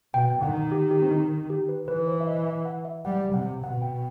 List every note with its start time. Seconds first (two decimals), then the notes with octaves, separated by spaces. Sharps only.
0.14 B2 G5
0.42 D#3 F#5
0.72 G4
0.91 G4
1.02 C4
1.11 D#4
1.50 G4
1.69 B4
1.88 E3 B4
2.07 C5
2.20 E5
2.28 D#5
2.47 E5
2.65 F#5
2.85 E5
3.05 G3 F#5
3.34 C3 F#5
3.63 B2 F#5
3.82 G5